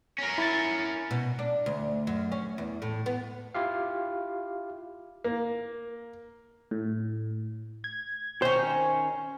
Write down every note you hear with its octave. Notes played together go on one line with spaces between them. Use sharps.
C#4 A#4
E4 A6
B2
D4
D2
F#2
C#4
E2
A2
B3
E4 F4 G4 F5
A#3
A2
G#6
D#3 C#4 C5